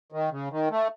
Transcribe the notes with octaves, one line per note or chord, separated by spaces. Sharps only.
D#3
C#3
D#3
A3